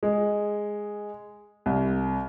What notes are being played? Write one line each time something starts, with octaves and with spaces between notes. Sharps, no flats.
G#3
C2